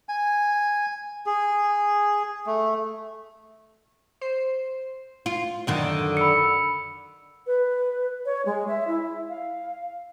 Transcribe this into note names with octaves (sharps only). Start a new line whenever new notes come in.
G#5
G#4
A3
C5
F4
F#2 D3 D#3
B5 E6 C#7
B4
C#5
G#3
E5
E4
F5